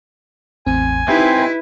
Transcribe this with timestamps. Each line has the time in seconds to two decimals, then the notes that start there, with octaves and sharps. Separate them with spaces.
0.66 A1 E2 C4 G#5
1.08 C4 D#4 E4 G4 B4 E5